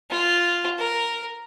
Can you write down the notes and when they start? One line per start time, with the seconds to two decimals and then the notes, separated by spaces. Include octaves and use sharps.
0.10 F4
0.78 A#4